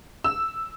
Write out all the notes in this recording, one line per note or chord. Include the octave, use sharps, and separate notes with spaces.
E6